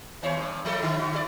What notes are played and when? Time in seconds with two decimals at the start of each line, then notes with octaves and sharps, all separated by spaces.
0.22 D#2 C5 C#5
0.37 G2
0.65 F3 A3 A4
0.82 D3 E4
0.99 C3 F#4
1.12 E4 G4 D5